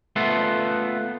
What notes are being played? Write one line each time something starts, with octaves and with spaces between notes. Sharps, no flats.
A3 B3 F4 A4